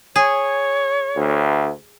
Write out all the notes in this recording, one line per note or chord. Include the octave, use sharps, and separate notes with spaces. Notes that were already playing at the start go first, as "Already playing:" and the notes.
G#4 C#5
D2